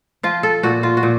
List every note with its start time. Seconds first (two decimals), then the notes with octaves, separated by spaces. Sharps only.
0.23 F3 F4
0.43 A4
0.63 A#2 F#4
0.83 F4
0.97 F#4
1.03 A#2